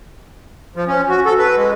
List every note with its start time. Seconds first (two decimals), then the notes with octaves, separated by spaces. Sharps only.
0.76 F3
0.88 C#4
1.09 F#4
1.26 A4
1.38 B4
1.57 G#3